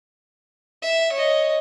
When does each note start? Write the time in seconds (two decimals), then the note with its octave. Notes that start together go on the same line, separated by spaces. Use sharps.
0.83 E5
1.12 C#5 D#5